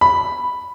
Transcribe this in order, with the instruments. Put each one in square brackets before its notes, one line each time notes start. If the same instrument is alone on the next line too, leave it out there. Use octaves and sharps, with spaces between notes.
[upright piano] B5